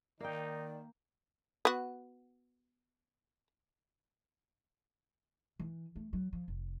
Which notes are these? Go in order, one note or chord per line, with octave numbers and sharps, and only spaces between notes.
D#3 A#3 D#4 D5 G5
B3 F#4
E3
A3
F#3
F3
F1